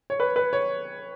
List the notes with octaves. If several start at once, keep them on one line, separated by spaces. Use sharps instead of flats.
C#5
B4
B4
C#5